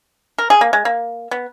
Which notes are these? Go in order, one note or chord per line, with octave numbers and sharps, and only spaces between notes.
A#4
G#4
A#3
G#3
A#3
B3